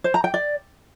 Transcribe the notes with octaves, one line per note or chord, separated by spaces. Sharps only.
C5
A#5
G5
D5